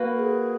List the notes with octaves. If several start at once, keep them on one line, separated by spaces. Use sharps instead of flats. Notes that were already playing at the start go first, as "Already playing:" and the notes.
Already playing: A#3 F#4 B4
A#4
G#4